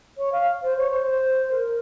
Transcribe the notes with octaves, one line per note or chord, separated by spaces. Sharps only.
C#5
F5
C5
C#5
C5
C5
A#4